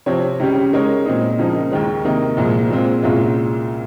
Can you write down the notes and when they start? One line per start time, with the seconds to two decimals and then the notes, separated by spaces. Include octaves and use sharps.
0.06 C3 F3 C4 G4 C#5
0.40 C#2 C#3 G3 C#4 G4
0.73 C#3 G#3 D#4 A#4 C#5
1.05 A#2 G#3 C4 D#4
1.38 C#2 C#3 F3 A#3 D#4
1.71 D#2 D#3 G#3
2.05 C3 D#3 A#3 D#4
2.37 C2 A#2 F3 G#3
2.70 A#2 G#3 C4 F4
3.03 C2 A#2 G#3 C#4 F4